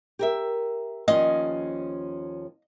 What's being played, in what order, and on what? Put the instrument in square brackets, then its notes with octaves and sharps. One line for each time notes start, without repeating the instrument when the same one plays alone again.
[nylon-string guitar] G4 A#4 E5
[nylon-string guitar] D#2 F3 C#4 [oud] D#5